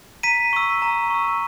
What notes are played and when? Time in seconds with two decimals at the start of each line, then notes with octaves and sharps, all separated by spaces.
0.23 A#5 B6 D#7
0.53 C#6 E6
0.82 A#5
1.10 C#6 E6